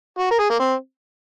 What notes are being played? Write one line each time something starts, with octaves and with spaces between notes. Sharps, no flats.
F#4
A#4
G#4
A#3
C4